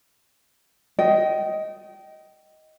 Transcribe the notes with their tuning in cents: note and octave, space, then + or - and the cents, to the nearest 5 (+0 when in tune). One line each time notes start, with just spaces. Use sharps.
D#5 +10 G5 -25